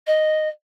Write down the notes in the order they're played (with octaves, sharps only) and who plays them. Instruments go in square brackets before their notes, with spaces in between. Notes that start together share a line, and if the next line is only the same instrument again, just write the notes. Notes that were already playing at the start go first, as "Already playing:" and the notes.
[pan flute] D#5